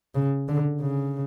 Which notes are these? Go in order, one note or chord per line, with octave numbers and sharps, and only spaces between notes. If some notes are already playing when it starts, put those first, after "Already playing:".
C#3
D3
C#3